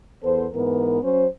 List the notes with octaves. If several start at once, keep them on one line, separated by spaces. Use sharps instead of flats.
E2 B3 A4 C5
G#2 E3 B3 A#4
F#3 C#4 C5